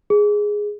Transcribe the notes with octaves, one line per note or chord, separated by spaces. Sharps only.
G#4